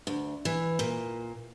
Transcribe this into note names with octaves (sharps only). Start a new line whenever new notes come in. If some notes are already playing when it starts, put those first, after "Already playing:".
D2
E3
A#2